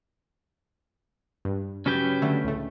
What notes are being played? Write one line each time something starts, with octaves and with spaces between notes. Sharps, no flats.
G2
C#3 F#3 C#4 G4 B4 G5
D3 A3
C#2 A2 A3